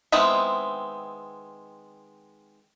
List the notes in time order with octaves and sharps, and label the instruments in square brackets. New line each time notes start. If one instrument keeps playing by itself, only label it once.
[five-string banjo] D#3 G#3 B3 C4 E4